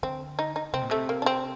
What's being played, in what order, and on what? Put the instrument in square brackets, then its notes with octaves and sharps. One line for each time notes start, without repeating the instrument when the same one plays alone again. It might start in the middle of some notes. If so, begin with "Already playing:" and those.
[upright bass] D3 [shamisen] C4
[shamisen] D#4
D#4
[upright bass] C3 [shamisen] C4
[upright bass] A#2
[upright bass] C3 [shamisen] A3
[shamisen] A#3
D4
C4